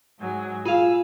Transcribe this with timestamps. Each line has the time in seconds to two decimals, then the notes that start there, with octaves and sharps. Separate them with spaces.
0.19 G#2 F#3 G#4
0.66 F4 G#4 F5 E6